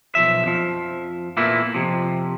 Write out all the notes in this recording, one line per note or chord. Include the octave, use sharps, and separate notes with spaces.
B1 F#2 F3 E5
F2 F3
E2 A#2 E3 A3 A#3 E4
F2 G#2 C3 F3